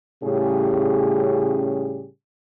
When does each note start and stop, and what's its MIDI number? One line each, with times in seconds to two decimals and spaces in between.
0.24 2.08 45
0.24 2.08 49
0.24 2.08 55
0.24 2.08 61
0.24 2.08 67
0.24 2.08 68